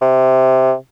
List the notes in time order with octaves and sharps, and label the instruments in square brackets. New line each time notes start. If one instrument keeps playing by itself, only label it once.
[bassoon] C3